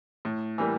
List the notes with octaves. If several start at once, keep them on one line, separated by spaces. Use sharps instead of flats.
A2
E3 G3 A#3